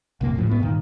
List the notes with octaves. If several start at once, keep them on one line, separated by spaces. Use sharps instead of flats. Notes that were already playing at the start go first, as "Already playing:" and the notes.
A#1 F#2 C3 A#3
A1 F#2 A2 F3
A2 G#3 B3
G2 A#2 D#3